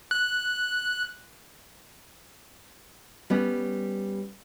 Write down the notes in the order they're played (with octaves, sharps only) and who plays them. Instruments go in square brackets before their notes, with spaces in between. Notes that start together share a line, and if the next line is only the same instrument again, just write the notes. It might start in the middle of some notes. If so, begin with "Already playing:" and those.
[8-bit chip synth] F#6
[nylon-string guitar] G3 B3 C#4